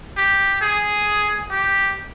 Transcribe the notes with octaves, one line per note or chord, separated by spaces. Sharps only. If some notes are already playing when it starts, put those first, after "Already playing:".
G4
G#4
G4